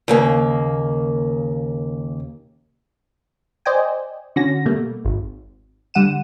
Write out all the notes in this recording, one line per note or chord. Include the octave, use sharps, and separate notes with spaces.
D#2 C#3 A#3
C5 D5 D#5 G5 G#5
D3 C#4 F#4 A#6
B2 G3 A3 A#3
G#1
D3 G3 F#5 D#7 E7